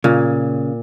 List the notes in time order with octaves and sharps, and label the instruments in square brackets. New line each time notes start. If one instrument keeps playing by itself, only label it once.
[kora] A#2 [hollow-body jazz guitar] C#3